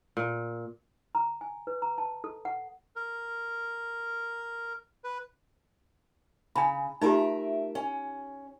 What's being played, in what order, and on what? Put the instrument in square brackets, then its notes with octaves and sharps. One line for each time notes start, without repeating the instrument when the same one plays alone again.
[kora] A#2
[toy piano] A#5
G#5
B4
A#5
A5
A4
F#5
[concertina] A#4
B4
[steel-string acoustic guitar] C#3 [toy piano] G#5 A#5 B5
[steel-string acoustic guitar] A3 A#4 E5 [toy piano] D#4 F4 G4
[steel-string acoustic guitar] C#4